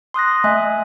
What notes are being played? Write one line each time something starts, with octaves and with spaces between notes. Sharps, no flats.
C6 D#6 F#6 A#6
A3 D#5 E5 G#5 F#6